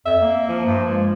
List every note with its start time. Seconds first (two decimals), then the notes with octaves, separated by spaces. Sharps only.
0.06 F2 E5
0.21 A#3
0.49 F3
0.65 G2
0.88 G#3